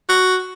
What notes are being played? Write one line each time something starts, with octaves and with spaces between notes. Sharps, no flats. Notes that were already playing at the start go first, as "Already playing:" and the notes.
F#4